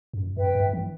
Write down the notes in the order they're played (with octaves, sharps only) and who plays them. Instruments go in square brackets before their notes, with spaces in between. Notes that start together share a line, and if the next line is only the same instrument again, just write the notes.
[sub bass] F#2
[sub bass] F#2 [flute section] B4 E5 G5
[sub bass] G2
E3